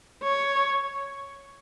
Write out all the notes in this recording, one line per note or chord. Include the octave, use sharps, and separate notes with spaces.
C#5